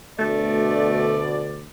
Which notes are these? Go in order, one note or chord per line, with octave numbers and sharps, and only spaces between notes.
D2 B2 A3 D5